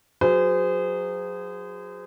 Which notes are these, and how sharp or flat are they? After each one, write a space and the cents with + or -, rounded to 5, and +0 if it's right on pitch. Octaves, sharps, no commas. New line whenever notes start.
F#3 -20 G#4 -15 C5 -35